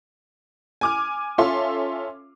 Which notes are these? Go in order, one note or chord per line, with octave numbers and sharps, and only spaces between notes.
G#5 D6 F6
C#4 F4 A4 E5 C6